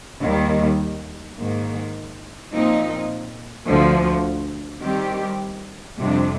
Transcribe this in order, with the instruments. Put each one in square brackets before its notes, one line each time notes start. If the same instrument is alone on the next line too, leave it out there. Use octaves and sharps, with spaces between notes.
[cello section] D#2 D#3 G3
G#2 D#3 A#3
A#2 F3 C4 D#4
D2 D3 F3
D#3 G3 C4 G4
F2 C3 G3 D4